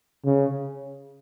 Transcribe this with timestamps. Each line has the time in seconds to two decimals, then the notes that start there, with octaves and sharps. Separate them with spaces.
0.25 C#3